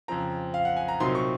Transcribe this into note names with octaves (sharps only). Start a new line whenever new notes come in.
F2 C#3 F3 C4 A#5
F5
F#5
G#5
A#5
C2 A#2 F#3 C4 D#4 C6
C#6